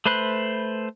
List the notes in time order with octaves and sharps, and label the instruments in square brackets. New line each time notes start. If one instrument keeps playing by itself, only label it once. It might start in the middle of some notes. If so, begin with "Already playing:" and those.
[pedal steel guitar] A3 B4 C5 B5 F#6